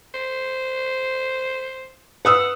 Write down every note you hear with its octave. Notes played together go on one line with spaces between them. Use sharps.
C5
B4 F#5 D#6 E6